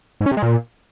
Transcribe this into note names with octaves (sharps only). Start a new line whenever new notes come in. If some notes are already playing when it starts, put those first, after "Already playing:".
G#2
C#4
C3
G#3
A#2